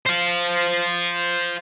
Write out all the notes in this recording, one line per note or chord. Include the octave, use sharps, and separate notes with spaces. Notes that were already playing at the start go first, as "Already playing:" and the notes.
C5 F5